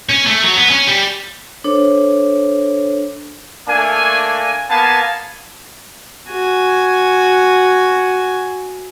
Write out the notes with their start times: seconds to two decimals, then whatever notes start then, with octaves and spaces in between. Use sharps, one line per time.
0.09 C#4
0.26 A3
0.43 F#3
0.57 B3
0.70 C#4
0.87 G3
1.64 D4 A4 C5 C#5
3.68 A3 A#3 D4 G#5
4.70 A#3 B3 F5 G#5 A5
6.28 F#4 G#5